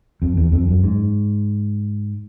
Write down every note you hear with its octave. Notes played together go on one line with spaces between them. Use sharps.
F2
E2
F2
F#2
G#2